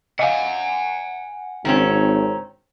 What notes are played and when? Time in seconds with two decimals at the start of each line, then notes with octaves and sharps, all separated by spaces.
0.19 D#5 F5 F#5 G#5
1.65 G#1 D#3 C4 C#4